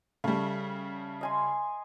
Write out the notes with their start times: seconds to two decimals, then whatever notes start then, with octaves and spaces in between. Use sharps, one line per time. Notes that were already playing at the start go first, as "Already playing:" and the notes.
0.24 C#3 G3 A3
1.21 D#5 G#5 C6